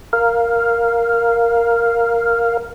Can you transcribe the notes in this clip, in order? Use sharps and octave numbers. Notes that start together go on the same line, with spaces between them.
A#4 F5